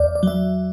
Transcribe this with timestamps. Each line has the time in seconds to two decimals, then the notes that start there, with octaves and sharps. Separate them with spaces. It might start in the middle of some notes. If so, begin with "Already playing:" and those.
Already playing: E2 D5
0.15 D5
0.23 F#3 E5